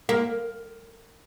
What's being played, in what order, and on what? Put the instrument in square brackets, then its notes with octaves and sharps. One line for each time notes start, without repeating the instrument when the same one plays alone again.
[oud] A#3